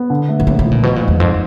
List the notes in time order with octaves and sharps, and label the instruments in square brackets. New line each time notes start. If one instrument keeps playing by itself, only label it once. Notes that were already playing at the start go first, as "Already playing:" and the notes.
Already playing: [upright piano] B3
D3
A3
[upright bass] B2
[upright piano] D#2 [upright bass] C3
[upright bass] B2
[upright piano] F3
[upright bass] A#2
[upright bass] B2 [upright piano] F3
[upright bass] A#2
[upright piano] G#2
[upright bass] E2
[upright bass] F2 [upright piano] G#2